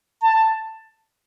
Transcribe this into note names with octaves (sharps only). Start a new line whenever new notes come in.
A5